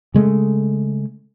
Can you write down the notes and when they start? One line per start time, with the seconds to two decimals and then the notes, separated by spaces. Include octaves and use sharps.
0.14 C#3 G#3 A3